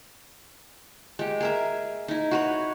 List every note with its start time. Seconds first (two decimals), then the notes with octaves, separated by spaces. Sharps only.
1.19 G#3 G4
1.40 G#4 A#4 E5
2.08 D#4 E4
2.31 F#4 B4 C#5